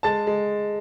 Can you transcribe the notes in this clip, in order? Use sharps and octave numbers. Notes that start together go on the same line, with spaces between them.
G#3 A5 A6
G#3